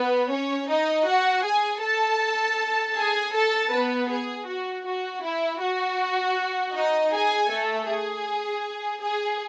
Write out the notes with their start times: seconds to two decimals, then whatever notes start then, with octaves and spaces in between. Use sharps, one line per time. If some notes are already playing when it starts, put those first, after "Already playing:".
Already playing: B3 B4
0.31 C#4 C#5
0.69 D#4 D#5
1.07 F#4 F#5
1.44 G#4 G#5
1.82 A4 A5
2.96 G#4 G#5
3.33 A4 A5
3.71 B3 B4
4.10 G#4
4.47 F#4
4.85 F#4
5.23 E4
5.61 F#4
6.74 D#4 D#5
7.12 G#4 G#5
7.50 A3 A4
7.88 G#4
9.02 G#4